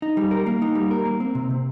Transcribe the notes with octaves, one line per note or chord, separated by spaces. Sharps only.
D#4
G3
A#4
A#3
D#4
G3
A#4
A#3
C4
C3
C3